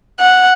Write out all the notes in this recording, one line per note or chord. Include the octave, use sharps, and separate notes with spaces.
F#5